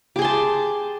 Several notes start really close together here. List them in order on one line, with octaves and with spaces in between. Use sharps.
G4 G#4 C6 A5